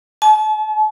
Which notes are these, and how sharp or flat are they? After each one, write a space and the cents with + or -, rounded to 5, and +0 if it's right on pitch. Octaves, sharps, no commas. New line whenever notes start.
A5 -40